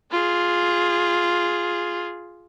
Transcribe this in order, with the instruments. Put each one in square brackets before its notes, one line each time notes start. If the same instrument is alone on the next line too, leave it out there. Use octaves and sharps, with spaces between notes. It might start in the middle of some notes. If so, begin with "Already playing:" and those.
[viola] F4 G#4